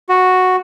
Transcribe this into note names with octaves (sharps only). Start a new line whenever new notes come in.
F#4